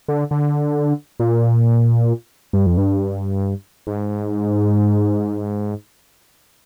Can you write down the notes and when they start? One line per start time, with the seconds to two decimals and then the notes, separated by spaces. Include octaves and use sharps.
0.08 D3
0.31 D3
1.20 A#2
2.53 G2
2.66 F2
2.78 G2
3.87 G#2